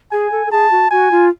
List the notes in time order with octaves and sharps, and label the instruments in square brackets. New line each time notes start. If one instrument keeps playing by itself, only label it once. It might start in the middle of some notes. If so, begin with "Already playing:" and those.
[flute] G#4 [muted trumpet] G#5
[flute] A4
A4
[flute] G#4 [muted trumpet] A5
[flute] F#4
[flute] F#4 [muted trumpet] G#5
[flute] F4